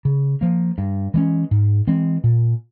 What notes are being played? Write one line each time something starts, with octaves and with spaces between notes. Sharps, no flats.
C#3
F3 A#3
G2
E3 G#3 C#4
G#2
E3 G#3 C4
A#2